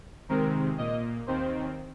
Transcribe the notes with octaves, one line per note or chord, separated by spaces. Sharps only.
C3 D#3 G#3 C4 A#4
A#2 A#3 D#5
D#2 D#3 C4 C5